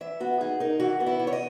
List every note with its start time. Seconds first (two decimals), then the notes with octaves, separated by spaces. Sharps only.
0.01 E3 E5
0.20 B3 F#4
0.40 D#4 G#4
0.60 D#4 A#4
0.80 E3 F#4
1.00 B3
1.06 E4
1.19 E3
1.27 C#5
1.33 D#5